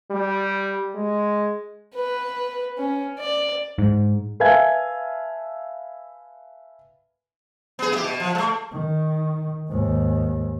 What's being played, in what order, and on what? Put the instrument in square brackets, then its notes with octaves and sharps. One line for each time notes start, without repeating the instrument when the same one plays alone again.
[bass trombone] G3
G#3
[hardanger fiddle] B4
C#4
D5
[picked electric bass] G#2
[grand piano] B4 E5 F5 G#5 A5 G#6
[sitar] B3 G#4
E4 G4
B2
F3
G#3 A3
[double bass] D#3
D#2 G#2